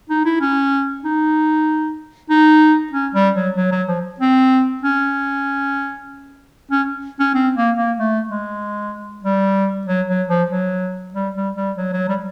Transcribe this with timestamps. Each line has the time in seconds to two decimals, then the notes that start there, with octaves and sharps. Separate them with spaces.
0.10 D#4
0.25 E4
0.41 C#4
1.04 D#4
2.30 D#4
2.93 C#4
3.15 G3
3.35 F#3
3.56 F#3
3.72 F#3
3.88 F3
4.20 C4
4.83 C#4
6.71 C#4
7.20 C#4
7.35 C4
7.56 A#3
7.77 A#3
7.98 A3
8.29 G#3
9.24 G3
9.87 F#3
10.08 F#3
10.29 F3
10.51 F#3
11.14 G3
11.35 G3
11.56 G3
11.77 F#3
11.93 F#3
12.09 G3